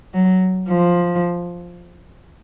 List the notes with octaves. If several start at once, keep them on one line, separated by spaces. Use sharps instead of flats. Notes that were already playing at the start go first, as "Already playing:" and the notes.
F#3
F3